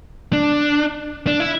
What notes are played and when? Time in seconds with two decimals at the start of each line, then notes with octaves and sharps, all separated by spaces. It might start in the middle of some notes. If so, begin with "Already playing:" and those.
0.33 D4
1.27 D4
1.40 E4